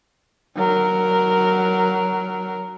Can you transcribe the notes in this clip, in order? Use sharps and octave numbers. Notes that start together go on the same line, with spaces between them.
F#3 A#4